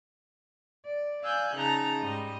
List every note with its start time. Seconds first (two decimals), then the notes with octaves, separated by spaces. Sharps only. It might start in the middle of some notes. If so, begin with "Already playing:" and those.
0.85 D5
1.23 D5 F5 G#5 E6 F#6 G6
1.55 C#3 D#4 A5 A#5 A#6
2.01 G#2 G3 D#5